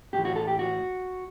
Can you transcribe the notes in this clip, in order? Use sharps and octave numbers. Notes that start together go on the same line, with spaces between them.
A2 E3 G4
F#4
A4
G4
F#4